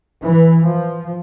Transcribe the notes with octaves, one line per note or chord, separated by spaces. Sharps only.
E3
F3